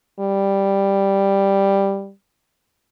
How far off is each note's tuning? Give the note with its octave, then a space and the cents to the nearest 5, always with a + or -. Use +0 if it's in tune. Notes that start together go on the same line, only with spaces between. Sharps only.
G3 +5